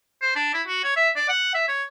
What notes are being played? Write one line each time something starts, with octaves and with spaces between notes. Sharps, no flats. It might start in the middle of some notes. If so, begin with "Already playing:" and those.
C5
D4
E4
F#4
C#5
E5
D5
F#5
E5
C#5